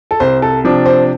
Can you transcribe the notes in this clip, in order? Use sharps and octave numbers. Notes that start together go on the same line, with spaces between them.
A4
C2 C5
A4
C3 F3 D4
C5